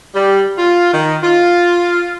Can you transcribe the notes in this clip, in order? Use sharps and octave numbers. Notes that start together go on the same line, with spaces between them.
G3
F4
D#3
F4